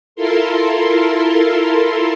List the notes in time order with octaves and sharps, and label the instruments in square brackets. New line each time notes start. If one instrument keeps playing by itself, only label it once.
[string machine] E4 F4 A4 A#4 C6